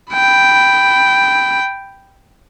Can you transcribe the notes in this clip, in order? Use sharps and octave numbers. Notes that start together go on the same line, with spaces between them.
G5 B5